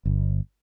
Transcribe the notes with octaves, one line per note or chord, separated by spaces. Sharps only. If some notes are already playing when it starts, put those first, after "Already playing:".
G1